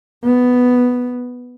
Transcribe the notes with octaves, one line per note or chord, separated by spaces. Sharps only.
B3